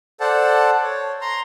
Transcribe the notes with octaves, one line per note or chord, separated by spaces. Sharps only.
A4 C5 D5 F#5 A5
C#5
A#5 C6